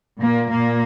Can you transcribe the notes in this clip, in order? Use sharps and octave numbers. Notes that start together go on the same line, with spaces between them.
A#2 A#3
A#2 A#3